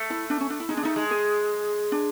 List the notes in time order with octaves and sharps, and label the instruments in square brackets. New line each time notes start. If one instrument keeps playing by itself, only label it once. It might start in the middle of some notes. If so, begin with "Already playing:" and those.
Already playing: [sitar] A3
[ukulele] E4
D4
C#4
D4
E4
[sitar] G#3 [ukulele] D#4
[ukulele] D4
[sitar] A3 [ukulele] D#4
[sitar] G#3
[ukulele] G#4
D4